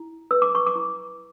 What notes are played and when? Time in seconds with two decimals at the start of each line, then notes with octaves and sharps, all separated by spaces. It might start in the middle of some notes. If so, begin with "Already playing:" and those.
Already playing: E4
0.31 B4 E6
0.42 D6
0.55 C#6
0.67 D6
0.75 E4